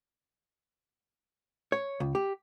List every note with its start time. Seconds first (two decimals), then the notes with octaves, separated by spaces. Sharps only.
1.72 C#5
2.00 C#2
2.15 G4